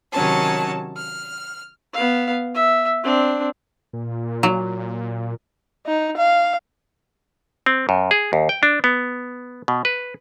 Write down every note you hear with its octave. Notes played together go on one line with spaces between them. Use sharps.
C3 D#3 F#3 C#4 A5
F6
B3 F5
E5
C4 D4
A#2
F#3
D#4
F5
C4
F#2
G#4
D#2
G5
D4
B3
B2
B4